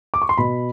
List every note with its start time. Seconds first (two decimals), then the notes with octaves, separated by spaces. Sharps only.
0.14 D6
0.22 C#6
0.29 C6
0.38 B2 B5